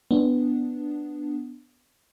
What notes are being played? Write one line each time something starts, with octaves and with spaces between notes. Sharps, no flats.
B3 D4